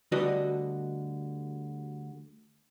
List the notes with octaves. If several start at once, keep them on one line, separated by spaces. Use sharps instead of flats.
D2 D3 G3 F#4 B4 D#5